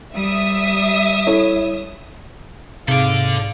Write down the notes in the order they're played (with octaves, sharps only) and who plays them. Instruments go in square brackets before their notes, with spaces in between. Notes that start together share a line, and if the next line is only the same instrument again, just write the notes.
[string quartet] G3 [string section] E5 D#6
[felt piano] E4 A4 C#5
[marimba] G#2 D#4 G#4 [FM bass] C3 [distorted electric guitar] A4 D5 [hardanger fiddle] F5